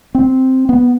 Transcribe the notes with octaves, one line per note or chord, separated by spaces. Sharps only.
C4
B3